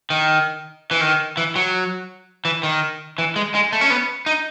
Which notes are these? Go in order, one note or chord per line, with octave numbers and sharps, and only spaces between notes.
D#3
E3
D#3
E3
F#3
E3
D#3
E3
G#3
G#3
A3
C#4
B3
D#4